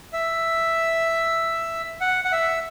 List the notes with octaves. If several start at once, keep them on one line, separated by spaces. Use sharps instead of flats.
E5
F#5
F#5
E5